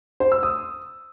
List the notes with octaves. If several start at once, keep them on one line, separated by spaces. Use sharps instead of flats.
C5
E6
D#6